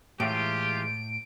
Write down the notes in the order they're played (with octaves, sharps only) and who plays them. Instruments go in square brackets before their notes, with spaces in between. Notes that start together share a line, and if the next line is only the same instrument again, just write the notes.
[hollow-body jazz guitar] A2 [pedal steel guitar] E3 G#3 [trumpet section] F4 G4 [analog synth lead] D7